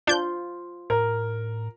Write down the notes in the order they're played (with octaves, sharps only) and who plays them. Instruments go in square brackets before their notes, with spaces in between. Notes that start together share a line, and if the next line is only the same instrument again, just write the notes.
[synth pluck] D4 G6 [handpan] F4 C5
[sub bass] A2 [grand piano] A#4